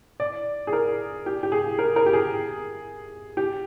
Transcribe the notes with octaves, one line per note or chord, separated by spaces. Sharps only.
D5
G#4
A#4
G4
G4
G#4
A#4
A#4
G4
G#4
G4